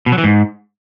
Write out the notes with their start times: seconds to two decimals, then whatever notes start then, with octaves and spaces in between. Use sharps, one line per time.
0.06 B2
0.12 F#3
0.18 E3
0.24 G#2